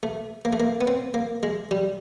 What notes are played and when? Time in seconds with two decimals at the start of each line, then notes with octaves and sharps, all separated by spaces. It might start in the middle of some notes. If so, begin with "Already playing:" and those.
0.03 A3
0.45 A#3
0.53 A3
0.60 A#3
0.81 B3
0.87 C4
1.14 A#3
1.43 G#3
1.71 G3